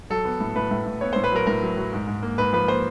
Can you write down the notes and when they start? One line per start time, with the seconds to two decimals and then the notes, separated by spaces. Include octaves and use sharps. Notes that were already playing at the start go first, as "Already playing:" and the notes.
0.10 F#3 A4
0.25 B3
0.40 A2
0.56 A2 B4
0.71 A2
0.86 A2
1.01 B3 C#5
1.13 C5
1.16 A2
1.24 B4
1.32 F#3 A#4
1.47 A2 A#4
1.62 F#3
1.77 F#3
1.93 G#2
2.07 G#2
2.22 A#3
2.38 G#2 B4
2.53 F3 B4
2.68 A#3 C5